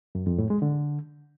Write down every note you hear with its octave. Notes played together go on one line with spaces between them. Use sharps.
F#2
F2
A2
G#3
D3